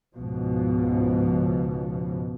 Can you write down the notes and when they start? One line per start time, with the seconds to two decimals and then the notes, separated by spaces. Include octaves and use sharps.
0.15 C#2 G#2 B2 F3